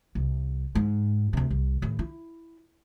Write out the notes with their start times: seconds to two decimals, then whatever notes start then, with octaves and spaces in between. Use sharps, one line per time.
0.15 C2
0.75 G#2
1.33 D2 C3
1.50 C2
1.82 D#2 A2
1.99 E4